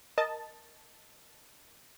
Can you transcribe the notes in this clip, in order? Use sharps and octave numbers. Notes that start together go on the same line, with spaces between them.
A#4 D#5 A5 A6